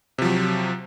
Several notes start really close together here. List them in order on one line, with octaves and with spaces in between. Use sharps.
C3 F3 F#3